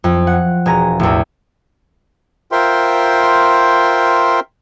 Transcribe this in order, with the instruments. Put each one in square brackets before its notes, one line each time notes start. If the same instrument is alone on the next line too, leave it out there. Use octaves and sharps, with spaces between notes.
[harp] F2
F#5
E1 G#4 A#5
A1 E2
[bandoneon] F4 A#4 C5 E5 G5 C6